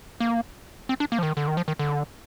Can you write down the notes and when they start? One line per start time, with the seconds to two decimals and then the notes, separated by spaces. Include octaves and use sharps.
0.20 A#3
0.89 C4
1.00 D4
1.12 A#3
1.19 F3
1.23 D#3
1.37 D3
1.47 D#3
1.57 F3
1.68 D#3
1.79 D3